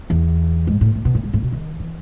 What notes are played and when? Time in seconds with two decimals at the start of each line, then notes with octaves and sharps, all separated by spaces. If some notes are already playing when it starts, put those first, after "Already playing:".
0.10 E2
0.67 G#2
0.81 A2
0.95 A2
1.05 B2
1.15 A2
1.24 G#2
1.33 A2
1.42 B2
1.52 D#3
1.80 E3